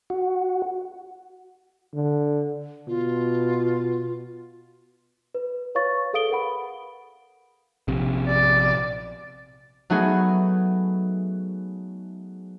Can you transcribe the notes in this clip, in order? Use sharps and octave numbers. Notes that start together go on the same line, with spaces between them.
F#4
D3
B2 F4
B4
B4 C#5 F5 C#6 A6
G#4 A4 F5 D#6 D7 G7
A#4 B4 F#5 B5
A#1 C3
D5
F#3 A3 B3 D#4 F#4 G#4